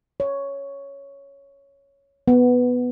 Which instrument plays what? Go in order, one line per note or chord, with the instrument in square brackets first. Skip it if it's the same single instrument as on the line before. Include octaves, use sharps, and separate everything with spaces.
[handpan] C#5
B3